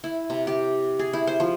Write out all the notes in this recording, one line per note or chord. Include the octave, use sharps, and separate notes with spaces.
E4
C3
G4
G#4
E4
C5
F3